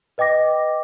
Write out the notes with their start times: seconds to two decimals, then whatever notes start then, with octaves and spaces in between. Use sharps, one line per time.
0.18 B4 D#5 G5 D6 A#6